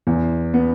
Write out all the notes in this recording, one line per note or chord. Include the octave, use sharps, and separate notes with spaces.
E2
B3